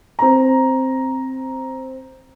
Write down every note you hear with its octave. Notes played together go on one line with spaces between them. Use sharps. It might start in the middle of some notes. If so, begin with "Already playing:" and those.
C4 A#5